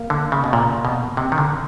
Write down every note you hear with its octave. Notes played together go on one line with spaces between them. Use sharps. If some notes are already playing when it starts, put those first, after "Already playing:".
Already playing: A#3
D3
C#3
B2
A#2
B2
C3
D#3
D3